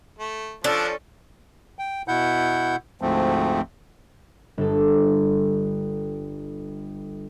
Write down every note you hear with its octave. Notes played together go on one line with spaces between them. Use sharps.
A3
F3 C#4 D4 A4
G5
B2 E4 F#5 G6
D2 G#2 F3 A3 C4
G1 A4